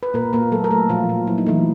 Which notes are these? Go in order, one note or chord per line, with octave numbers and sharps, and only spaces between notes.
B4
A#2 A#3 A#4
A#2 A#3 A#4
F#3 A3 A4
A#4
A3 A4
A#2 F3 F4
A#2
F#3 E4
D#4
E3 A3 E4